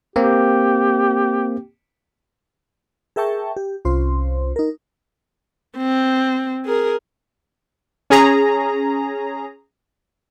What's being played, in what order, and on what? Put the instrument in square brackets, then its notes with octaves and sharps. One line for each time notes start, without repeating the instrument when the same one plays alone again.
[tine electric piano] A#3 C4 [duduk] G4
[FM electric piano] G#4 A#4 E5 G5 A5 C#6
G4
C2 C#4 F4 C5 C6
D#4 A#4
[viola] C4
G#4 A#4
[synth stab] C#4 G#4 A#5